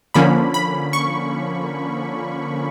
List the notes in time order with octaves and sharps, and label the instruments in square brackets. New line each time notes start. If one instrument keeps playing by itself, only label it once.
[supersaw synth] D3 F3 A#3 C#4 B5
B5
C#6